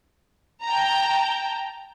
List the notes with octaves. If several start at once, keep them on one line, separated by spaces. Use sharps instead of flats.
G5 A5 A#5